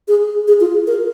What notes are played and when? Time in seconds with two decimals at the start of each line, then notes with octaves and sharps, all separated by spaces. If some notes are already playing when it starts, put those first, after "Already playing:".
0.08 G#4
0.48 G#4
0.61 F4
0.87 A#4